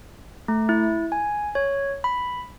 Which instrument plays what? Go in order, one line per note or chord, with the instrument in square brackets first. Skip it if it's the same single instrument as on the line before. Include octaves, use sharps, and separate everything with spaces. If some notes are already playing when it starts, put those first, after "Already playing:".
[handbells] A3
E4
G#5
C#5
B5